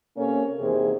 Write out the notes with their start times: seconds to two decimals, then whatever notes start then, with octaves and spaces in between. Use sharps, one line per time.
0.17 C3 A#3 C#4 A4 A#4 C#5
0.60 E2 C3 D#3 A#3 G#4 C5